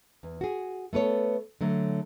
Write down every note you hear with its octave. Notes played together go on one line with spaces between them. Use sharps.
E2
F#4 G#4
A3 B3 A4 C#5
D3 F#3 A3